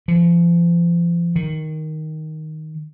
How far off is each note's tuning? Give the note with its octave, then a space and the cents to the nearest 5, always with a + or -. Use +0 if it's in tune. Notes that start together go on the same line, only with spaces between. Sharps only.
F3 -35
D#3 +5